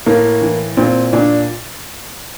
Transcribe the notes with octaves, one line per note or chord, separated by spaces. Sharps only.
A2 A#3
E3
A#2 C4
A#2 D4